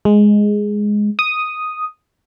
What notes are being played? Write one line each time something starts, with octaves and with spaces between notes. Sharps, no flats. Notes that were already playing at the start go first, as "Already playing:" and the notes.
G#3
D#6